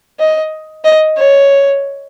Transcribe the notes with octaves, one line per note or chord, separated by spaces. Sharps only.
D#5
D#5
C#5